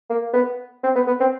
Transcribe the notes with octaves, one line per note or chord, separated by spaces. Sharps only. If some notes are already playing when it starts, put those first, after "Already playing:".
A#3
B3
C4
B3
B3
C4